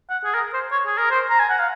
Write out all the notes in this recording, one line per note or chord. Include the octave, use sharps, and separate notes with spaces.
F#5
G#4
A#4
C5
C#5
G#4
A#4
C5
A#5
G#5
F#5
F5